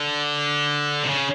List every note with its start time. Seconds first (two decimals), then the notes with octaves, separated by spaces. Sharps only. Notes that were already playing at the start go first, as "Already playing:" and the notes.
Already playing: D3
1.04 C3
1.08 C#3